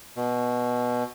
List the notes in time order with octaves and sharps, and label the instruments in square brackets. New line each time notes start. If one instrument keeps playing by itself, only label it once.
[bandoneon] B2